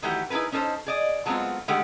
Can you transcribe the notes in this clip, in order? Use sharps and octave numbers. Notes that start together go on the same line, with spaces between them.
D#3 E3 F#3 A3 F#4 G4
D#4 E4 G#4 A#4 B4
C#4 D#4 A4 B4 C5
G#4 D5 D#5
F#3 G#3 A3 B3 C4 F4
D3 D#3 G#3 A3 G4 F#5